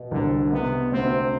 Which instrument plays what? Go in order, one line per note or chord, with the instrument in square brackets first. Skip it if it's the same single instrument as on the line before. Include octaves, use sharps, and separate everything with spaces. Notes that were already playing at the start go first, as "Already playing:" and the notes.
Already playing: [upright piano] B2
[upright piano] C2 [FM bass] D3
[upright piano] C3 [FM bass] B3
[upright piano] D2 [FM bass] C4